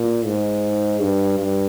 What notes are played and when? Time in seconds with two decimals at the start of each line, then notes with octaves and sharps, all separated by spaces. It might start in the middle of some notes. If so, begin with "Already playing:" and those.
Already playing: A#2
0.26 G#2
1.01 G2
1.38 G2